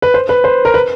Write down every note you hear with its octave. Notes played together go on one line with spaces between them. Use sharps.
B4
C5
B4
C5
A#4
B4